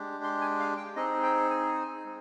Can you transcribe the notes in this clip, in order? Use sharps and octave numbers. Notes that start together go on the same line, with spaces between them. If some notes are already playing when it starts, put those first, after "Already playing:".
Already playing: G#3 D4 G4
C6
G#5
F5
G5
C4 D#4 G#4 D#5
G5
G#5
G#3 C4